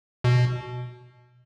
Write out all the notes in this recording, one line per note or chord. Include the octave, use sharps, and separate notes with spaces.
B2